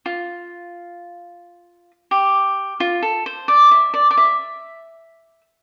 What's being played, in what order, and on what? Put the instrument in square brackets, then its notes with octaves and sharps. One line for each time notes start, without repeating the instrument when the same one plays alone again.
[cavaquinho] F4
G4
F4
A4
C5
D5
E5
D5
D5
E5